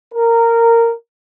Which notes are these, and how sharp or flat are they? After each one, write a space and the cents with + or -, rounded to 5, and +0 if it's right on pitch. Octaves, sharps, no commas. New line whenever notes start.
A#4 -15